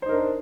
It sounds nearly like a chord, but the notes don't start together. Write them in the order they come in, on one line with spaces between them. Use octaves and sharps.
C5 D#4 A#4 D4